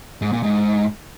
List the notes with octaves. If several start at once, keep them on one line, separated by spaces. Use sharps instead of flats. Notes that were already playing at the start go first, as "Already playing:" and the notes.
G#2
A#2
G#2